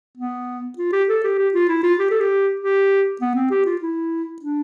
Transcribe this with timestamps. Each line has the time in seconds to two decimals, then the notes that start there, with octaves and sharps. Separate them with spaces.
0.17 B3
0.78 F4
0.92 G4
1.09 A4
1.24 G4
1.38 G4
1.54 F4
1.69 E4
1.83 F4
1.99 G4
2.11 A4
2.21 G4
2.60 G4
3.21 B3
3.35 C4
3.50 G4
3.65 F4
3.81 E4
4.42 D4